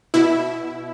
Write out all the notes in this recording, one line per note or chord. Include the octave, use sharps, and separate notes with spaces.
B2 E4